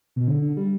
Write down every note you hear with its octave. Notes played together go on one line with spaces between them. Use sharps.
B2
D3
D3
G3